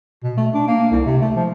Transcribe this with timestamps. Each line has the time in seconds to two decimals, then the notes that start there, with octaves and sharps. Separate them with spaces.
0.24 B2
0.38 A3
0.54 D4
0.68 A#3
0.92 C2
1.06 C3
1.22 A3
1.36 F3